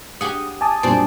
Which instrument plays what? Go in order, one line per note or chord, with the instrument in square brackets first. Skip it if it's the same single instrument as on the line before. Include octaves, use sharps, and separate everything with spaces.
[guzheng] G4 G#4 F#5 [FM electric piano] D#6
[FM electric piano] G#5 A5 D#6 [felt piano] D6
[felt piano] A#2 F#3 G3 [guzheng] D4 C5 D5